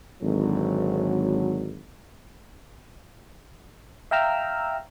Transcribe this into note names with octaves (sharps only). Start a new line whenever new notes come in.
G#1 D3 F#3
E5 F5 G5 A#5 E6 F6